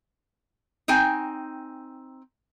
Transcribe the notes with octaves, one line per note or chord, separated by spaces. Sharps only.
C4 D#4 G5 G#5